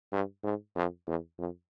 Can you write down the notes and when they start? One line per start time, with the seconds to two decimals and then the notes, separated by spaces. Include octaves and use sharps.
0.12 G2
0.44 G#2
0.76 F2
1.07 E2
1.38 F2